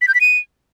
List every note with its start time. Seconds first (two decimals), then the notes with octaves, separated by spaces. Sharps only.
0.02 B6
0.08 G6
0.14 B6
0.21 D#7